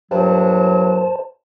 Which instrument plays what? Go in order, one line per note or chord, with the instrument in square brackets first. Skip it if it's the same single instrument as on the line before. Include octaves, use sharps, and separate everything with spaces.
[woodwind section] G2 A#2 F#3 [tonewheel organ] C5 A5